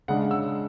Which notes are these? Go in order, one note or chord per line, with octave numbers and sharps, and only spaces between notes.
C#3 G#3 D4 F#5
E6